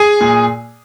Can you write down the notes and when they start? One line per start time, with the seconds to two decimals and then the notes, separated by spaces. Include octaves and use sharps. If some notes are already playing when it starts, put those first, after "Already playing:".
Already playing: G#4 G#5
0.21 A#2